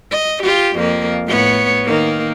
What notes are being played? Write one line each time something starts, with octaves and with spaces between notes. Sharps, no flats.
D#5
F4 G4
F2 A#3
A2 B3 C#5
D#3 A#3